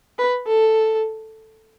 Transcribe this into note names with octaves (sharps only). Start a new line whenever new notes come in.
B4
A4